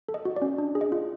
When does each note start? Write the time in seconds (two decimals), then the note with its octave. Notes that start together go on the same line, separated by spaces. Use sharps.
0.09 A4
0.14 D#5
0.25 F#4
0.36 D5
0.42 C#4
0.58 D4
0.75 G#4
0.81 D#5
0.92 F4